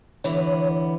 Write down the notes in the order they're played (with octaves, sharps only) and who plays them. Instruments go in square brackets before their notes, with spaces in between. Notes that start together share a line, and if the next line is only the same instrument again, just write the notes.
[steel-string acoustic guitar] D3 E3 B3 [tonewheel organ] C#5